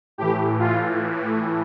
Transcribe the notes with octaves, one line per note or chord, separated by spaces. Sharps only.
A2 E3 G4
F4